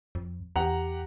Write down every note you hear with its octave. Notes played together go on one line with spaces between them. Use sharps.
F2
E2 G4 F#5 A#5